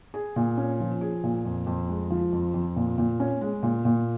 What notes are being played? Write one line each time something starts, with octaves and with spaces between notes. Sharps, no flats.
G#4
A#2
C#4
F3
G#4
A#2
F2
F2
G#3
F3
F2
F2
A#2
A#2
C#4
G#3
A#2
A#2